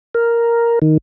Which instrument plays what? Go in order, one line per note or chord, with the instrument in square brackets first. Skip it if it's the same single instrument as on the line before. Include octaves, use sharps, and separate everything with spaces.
[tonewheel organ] A#4
D#3